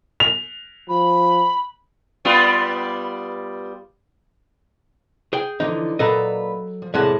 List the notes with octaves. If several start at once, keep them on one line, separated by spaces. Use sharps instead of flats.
F7
F3 B5
G3 B3 F4
G#4 G5
D3 E3 F3 D#4
A#2 F#3 A4 B4 D#5 A#5
F3
E2 A2 C3 G#3 F#5 A5